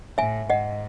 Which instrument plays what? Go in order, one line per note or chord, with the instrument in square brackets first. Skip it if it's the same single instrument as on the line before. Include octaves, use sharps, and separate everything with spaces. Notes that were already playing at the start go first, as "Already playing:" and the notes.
[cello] A2 [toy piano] E5 G#5
[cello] G#2 [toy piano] D#5 F#5